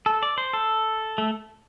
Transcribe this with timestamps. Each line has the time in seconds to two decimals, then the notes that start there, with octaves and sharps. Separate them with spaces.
0.06 A4
0.23 D5
0.38 C5
0.53 A4
1.18 A3